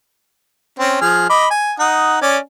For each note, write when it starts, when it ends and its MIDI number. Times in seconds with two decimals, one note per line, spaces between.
0.79 0.97 60
0.79 0.97 61
1.01 1.27 53
1.01 1.27 68
1.01 1.27 89
1.30 1.46 75
1.30 1.46 83
1.30 1.46 86
1.51 1.73 80
1.79 2.21 63
1.79 2.21 78
1.79 2.21 87
2.22 2.38 61
2.22 2.38 74
2.22 2.38 80